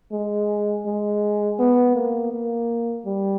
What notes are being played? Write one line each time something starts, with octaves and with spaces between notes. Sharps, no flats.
G#3
G#3
B3
A#3
A#3
G3